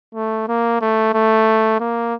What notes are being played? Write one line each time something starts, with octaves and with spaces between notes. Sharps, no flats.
A3
A#3
A3
A3
A#3